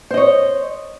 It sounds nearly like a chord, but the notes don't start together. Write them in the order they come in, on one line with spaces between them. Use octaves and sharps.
C5 D#5 C#5